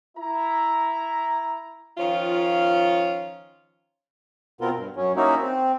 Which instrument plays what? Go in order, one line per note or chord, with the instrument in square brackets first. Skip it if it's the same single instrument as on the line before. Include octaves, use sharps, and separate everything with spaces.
[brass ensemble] E4 A#5
[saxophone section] D#3 F3 C#4 F4
[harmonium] B2 B3 C4 F4 A#4
G2
F#2 F#3 C#4
A#3 C#4 D#4 E4 F#4
C4